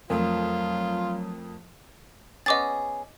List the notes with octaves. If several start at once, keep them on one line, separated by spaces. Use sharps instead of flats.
F2 F#3 A3 F4 A#4
B3 C#4 G#4 D#5 D6 A6